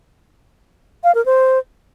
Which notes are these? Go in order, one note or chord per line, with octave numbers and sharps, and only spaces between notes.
F5
A#4
C5